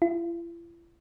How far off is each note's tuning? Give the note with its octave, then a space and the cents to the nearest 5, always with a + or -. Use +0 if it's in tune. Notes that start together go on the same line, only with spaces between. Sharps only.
E4 +45